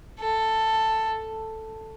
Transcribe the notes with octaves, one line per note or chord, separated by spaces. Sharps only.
A4